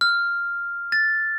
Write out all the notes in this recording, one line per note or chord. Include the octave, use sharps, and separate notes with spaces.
F6
A6